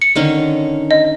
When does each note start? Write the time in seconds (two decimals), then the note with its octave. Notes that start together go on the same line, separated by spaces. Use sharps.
0.02 C#7
0.15 D3 D#3 C#4
0.91 D#5